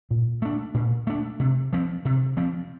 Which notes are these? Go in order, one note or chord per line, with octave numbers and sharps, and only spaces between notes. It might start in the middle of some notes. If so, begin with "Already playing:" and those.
A#2
A3 D4
A#2
A3 D4
C3
F3 C4
C3
F3 C4